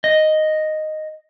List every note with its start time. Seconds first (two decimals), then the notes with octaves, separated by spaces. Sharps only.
0.04 D#5